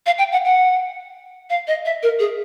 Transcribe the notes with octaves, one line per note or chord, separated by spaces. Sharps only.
F5
G5
F#5
F#5
F5
D#5
E5
A#4
G#4